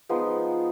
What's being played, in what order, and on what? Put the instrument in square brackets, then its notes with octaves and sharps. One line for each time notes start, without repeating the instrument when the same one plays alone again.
[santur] F3 G#3 B3 D#4